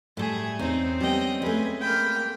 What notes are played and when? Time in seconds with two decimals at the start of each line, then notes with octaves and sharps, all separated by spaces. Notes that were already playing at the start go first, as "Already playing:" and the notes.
0.17 A2 G3 A3 G#4
0.59 E2 C4 C#4 D#4 C5
1.01 G3 B3 D#5 G5
1.42 G#3 A3 B4 G#5
1.81 A#3 G5 B5 F6